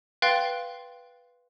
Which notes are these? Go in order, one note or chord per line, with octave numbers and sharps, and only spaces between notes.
B4 F5 G5 C6 F#6 A6